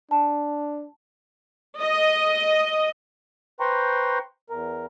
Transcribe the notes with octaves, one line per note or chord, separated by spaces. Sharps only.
D4 A5
D#5
B4 C5 G5 A#5 C6 C#6
E2 A#4